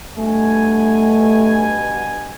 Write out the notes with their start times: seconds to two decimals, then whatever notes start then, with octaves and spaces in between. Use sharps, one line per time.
0.19 G2 B2 A3 G#5